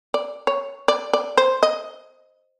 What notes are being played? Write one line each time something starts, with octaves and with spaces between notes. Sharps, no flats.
D5
C#5
D5
D5
C5
D#5